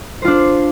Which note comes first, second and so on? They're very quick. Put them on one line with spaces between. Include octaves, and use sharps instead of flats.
C5 F4 D4